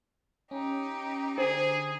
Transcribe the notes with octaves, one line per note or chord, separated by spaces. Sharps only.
C#4 D#4 G4
D3 G#4 C5